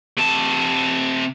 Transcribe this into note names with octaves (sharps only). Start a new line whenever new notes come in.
C3 A5